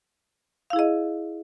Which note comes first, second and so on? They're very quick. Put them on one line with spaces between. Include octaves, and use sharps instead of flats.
F5 E4 G#4 D#5